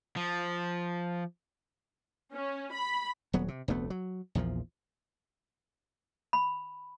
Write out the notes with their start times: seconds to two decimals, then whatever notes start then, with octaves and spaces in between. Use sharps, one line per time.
0.16 F3
2.34 C#4
2.73 B5
3.33 D#1 F#3 B3
3.48 C3
3.68 F1 D2 A3 B3
3.90 F#3
4.35 A#1 E2 A#2 F3
6.33 B5